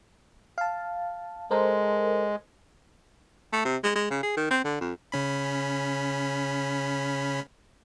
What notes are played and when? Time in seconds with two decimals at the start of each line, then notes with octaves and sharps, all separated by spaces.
0.58 F5 A5
1.51 G#3 A4 A#4 C5
3.53 A3
3.65 C3
3.84 G#3
3.96 G#3
4.11 C#3
4.23 G#4
4.37 D#3
4.51 C4
4.64 D3
4.81 F2
5.12 C#3 C#4 B5